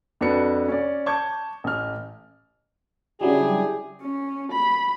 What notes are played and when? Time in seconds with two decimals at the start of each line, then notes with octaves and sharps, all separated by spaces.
0.21 F2 D4 F#4 B4 C#7
0.68 C#4 D5
1.06 A5 C#6 D6 G6 G#6
1.64 A1 F6
3.21 C#3 F#3 G3 D4 E4 G4 G#4
4.02 C#4
4.52 B5